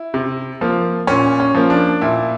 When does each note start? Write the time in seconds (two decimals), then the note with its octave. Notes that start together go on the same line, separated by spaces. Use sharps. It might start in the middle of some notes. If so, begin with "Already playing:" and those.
Already playing: E4
0.14 C3
0.61 F3 A#3
1.07 A#2 C#4
1.40 C#4
1.55 F3 A#3
1.70 D4
2.01 A#2 E4